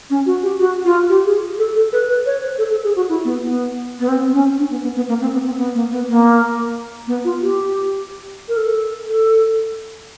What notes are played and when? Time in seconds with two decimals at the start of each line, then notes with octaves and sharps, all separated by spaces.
0.10 C#4
0.26 F#4
0.43 G4
0.60 F#4
0.85 F4
1.09 G4
1.26 G#4
1.58 A4
1.75 A4
1.92 B4
2.09 B4
2.26 C#5
2.42 C5
2.58 A4
2.71 A4
2.84 G#4
2.96 F#4
3.09 E4
3.25 B3
3.42 B3
3.99 B3
4.08 C4
4.33 C#4
4.58 D4
4.70 B3
4.83 B3
4.96 B3
5.08 A#3
5.21 C4
5.33 B3
5.46 C4
5.58 B3
5.74 A#3
5.92 B3
6.08 A#3
7.07 B3
7.25 F4
7.41 G4
8.49 A#4
8.57 A4
9.07 A4